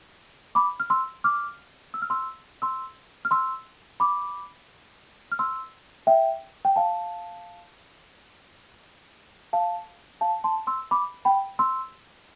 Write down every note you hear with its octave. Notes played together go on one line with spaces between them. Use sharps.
B5 D6
F6
C6 E6
D6 F6
E6
F6
C6 E6
C6 E6
F6
C6 E6
B5 D6
F6
C6 E6
E5 G5
G5
F5 A5
F5 A5
F5 A5
A5 C6
C6 E6
B5 D6
G5 B5
C6 E6